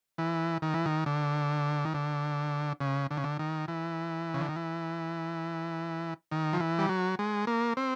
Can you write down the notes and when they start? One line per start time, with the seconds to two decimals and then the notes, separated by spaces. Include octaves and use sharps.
0.18 E3
0.62 D#3
0.74 E3
0.86 D#3
1.06 D3
1.85 D#3
1.94 D3
2.81 C#3
3.11 D3
3.17 C#3
3.24 D3
3.39 D#3
3.68 E3
4.34 C#3
4.41 D3
4.49 D#3
4.56 E3
6.31 D#3
6.53 F3
6.60 E3
6.79 G3
6.89 F#3
7.19 G#3
7.47 A#3
7.77 C4